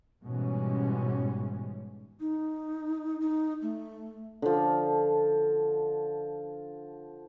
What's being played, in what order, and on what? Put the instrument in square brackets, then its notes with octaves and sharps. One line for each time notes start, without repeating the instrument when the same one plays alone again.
[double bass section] G#2 B2 E3 G3 G#3 C#4
[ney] D#4
D#4
A3
[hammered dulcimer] D3 F3